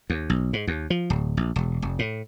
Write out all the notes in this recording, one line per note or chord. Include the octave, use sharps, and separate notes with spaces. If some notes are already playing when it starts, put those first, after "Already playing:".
D#2
B1
G#2
D#2
F3
D1
A#1
E1
F1
A2